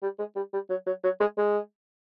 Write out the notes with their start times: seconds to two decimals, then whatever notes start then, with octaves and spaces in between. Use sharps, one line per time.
0.02 G3
0.19 G#3
0.36 G3
0.53 G3
0.70 F#3
0.86 F#3
1.04 F#3
1.20 G#3
1.38 G#3